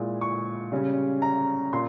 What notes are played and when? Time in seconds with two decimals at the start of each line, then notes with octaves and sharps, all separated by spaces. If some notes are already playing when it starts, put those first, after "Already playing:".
Already playing: A#2 G#3 E4
0.21 C#6
0.72 C#3 G3 C#4
1.22 A#5
1.73 A#2 C6